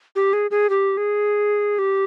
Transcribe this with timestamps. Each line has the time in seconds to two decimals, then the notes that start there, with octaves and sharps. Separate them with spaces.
0.16 G4
0.33 G#4
0.51 G#4
0.70 G4
0.97 G#4
1.79 G4